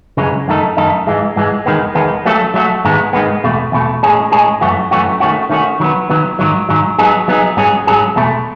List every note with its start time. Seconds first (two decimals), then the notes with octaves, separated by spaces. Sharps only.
0.17 F#2 C#3 E3 G#3 C#4
0.48 F#2 D#3 A3 D#4 A4
0.77 F#2 D#3 A3 D#4 A4
1.07 G#2 E3 G#3
1.36 G#2 E3 G#3
1.66 E2 D#3 G#3 B3
1.95 E2 D#3 G#3 B3
2.26 F#3 A3 C#4 F#4 A4
2.54 F#3 A3 C#4 F#4 A4
2.85 G#2 D#3 G#3 B3
3.13 G#2 D#3 G#3 B3
3.44 E2 B2 A3
3.72 E2 B2 A3
4.03 A2 G#3 C#4 G#4
4.32 A2 G#3 C#4 G#4
4.61 F#2 E3 A3 C#4 F#4
4.91 F#2 E3 A3 C#4 F#4
5.20 D#3 A3 C#4 F#4
5.50 D#3 A3 C#4 F#4
5.80 D#3 F#3 B3
6.10 D#3 F#3 B3
6.39 G#2 D#3 F#3
6.69 G#2 D#3 F#3
6.99 F#3 B3 D#4 G#4
7.28 F#3 B3 D#4 G#4
7.57 G#2 F#3 C#4 G#4
7.87 G#2 F#3 C#4 G#4
8.16 E2 B2 A3